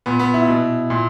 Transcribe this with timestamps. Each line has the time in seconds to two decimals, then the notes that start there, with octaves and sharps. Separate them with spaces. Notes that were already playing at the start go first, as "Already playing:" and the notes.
0.06 A#2 B3
0.19 B3
0.34 E4
0.48 B2
0.90 A#2